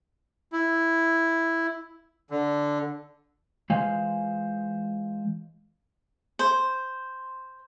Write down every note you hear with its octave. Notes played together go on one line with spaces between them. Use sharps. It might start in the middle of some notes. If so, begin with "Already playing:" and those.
E4
D3
E3 G#3 F4 C5 F5 G#5
C5